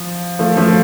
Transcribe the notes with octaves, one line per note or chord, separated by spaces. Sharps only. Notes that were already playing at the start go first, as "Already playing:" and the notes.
Already playing: F3
F3 A3
F3 A3